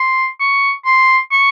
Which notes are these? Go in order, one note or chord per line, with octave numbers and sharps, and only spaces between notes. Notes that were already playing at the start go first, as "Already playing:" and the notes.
Already playing: C6
C#6
C6
C#6